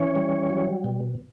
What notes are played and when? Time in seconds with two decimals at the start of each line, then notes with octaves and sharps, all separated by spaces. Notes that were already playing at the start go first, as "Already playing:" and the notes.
Already playing: E3 C#4 C#5
0.15 G3
0.50 F#3
0.84 B2